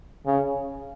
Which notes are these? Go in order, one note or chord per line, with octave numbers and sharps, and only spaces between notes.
C#3